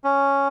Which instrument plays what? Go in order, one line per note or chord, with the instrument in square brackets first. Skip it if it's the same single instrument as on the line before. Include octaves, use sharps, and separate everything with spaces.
[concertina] C#4